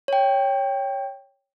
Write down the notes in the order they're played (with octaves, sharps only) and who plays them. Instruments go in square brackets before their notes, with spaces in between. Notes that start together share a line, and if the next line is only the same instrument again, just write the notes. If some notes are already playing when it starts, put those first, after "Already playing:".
[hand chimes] C#5 G5